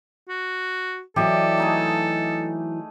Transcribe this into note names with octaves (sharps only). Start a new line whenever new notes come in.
F#4
E3 F#3 F#4 G4 A4 D5 D#5
A3 D#4 G#4